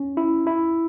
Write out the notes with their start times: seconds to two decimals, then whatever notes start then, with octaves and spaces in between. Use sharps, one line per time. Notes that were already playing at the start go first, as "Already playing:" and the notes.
Already playing: C#4
0.17 E4
0.47 E4